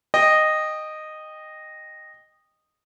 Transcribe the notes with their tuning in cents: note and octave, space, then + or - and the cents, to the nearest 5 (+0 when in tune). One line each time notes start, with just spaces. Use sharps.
D#5 -10 G5 +10